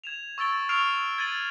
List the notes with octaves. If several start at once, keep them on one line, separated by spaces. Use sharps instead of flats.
G#6 E7 F7
C#6 E6 A6 D7 G7
C#6 E6 F6 C7 D7 F7
G#6 A6 D7 D#7 F#7 G7